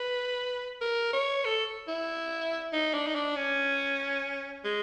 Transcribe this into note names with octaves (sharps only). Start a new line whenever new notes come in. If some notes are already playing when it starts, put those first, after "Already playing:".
Already playing: B4
A#4
C#5
A4
E4
D#4
D4
D#4
D4
C#4
G#3